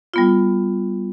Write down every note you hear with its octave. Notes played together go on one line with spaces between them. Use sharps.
G3 B3 F4